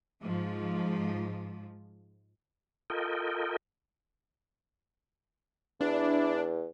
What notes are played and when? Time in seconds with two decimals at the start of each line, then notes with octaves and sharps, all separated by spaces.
0.22 G#2 F3
2.90 F4 A4 A#4 D#5 G5
5.81 E2 D4 E4